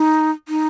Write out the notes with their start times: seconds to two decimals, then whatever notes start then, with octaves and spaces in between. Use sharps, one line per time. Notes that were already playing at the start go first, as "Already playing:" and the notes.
Already playing: D#4
0.48 D#4